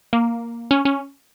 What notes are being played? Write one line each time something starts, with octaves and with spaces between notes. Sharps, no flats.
A#3
C#4
C#4